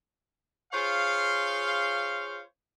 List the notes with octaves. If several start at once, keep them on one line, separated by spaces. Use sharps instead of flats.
F4 G#4 C5 C#5 F5